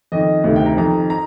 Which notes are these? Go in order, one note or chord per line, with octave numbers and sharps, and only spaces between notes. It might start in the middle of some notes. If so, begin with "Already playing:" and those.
F2 D#3 D#5
D2 C3 D#3
G5
A#5
F2 D#3 A#5
A#5